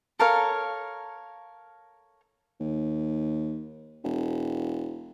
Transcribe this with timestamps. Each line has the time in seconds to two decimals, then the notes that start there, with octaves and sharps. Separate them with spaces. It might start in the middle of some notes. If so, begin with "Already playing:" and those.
0.19 A4 A#4 C#5 F5
2.60 D#2
4.04 E1